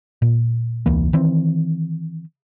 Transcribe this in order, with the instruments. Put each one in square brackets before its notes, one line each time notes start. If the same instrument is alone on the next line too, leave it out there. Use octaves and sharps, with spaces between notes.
[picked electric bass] A#2
E1 C#2 E3 A#3
D#3 E3 C4